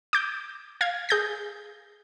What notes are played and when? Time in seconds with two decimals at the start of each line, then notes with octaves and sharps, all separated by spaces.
0.13 D6 G6
0.81 F5 G#6
1.09 G#4 G6 A#6